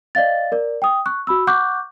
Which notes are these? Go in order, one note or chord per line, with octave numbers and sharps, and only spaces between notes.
D5 D#5 F5 A6
A#4 D5
G5 D#6
C#6 F#6
F#4 B5 E6
F#5 C#6 D6 F#6 G6